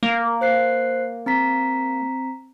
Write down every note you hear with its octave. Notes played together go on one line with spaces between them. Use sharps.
A#3
C5 F#6 C7
C4 A#5 B6